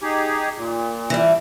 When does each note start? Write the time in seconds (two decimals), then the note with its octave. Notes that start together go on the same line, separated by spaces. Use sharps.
0.01 D#4 G4 G#4
0.56 A#2
1.10 E3 G3